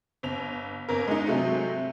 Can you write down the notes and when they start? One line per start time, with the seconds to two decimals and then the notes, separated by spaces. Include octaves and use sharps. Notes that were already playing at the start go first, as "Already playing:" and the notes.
0.23 G1 F7
0.89 G1 A#4
1.07 G#3 D#4
1.27 C3 F#3 G#3 A3